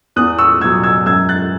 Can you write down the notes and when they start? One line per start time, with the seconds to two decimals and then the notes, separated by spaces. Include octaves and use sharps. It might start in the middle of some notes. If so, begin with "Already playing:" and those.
0.16 E2 D#6 F#6
0.39 C#6 E6
0.61 B2 F#3 E6 G#6
0.83 E6 G#6
1.06 F#2 E6 G#6
1.29 F#6 A6